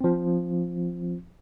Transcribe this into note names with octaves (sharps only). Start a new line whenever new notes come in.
F3 C4